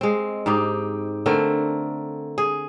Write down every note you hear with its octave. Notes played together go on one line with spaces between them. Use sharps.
G#3 C4
G#2 C4 D#4 G4
D3 A3 C4 A#4
G#4